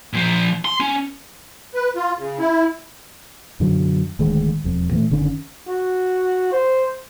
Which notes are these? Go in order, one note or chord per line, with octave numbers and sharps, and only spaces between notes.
A#2 F3
C6
C#4
B4
F4
C#3
E4
F#2 B2 D3 F#3
D1 D2 D#3 G#3
E1 F2
A#2 E3 A3
F#1 D3 D#3 C#4
F#4
C5